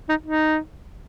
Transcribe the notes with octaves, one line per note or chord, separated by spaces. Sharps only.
D#4
D#4